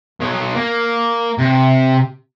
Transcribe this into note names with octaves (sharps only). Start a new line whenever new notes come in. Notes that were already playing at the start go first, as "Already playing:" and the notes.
B2 C#5
A#3
C3